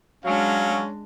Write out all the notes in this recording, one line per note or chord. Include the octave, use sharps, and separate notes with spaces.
F#3 G#3 C#4 D4 F5